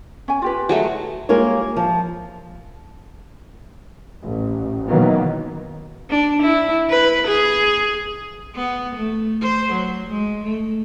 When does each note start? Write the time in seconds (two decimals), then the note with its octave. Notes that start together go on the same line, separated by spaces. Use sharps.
0.28 C#4 G#5
0.42 F4 G4 B4
0.69 F#3 G#3 A3
1.29 G3 G#3 A#3 F4 A#4 C#5
1.76 F3
4.24 A1
4.87 B2 D#3 E3 F#3 A#3 B3
6.10 D4
6.42 E4
6.90 B4
7.27 G#4
8.56 B3
8.96 A3
9.41 C5
9.72 F#3
10.09 G#3
10.45 A3